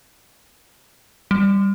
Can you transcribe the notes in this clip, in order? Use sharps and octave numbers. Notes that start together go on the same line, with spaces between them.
G3